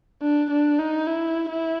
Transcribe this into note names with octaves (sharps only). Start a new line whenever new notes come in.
D4
D4
D#4
E4
E4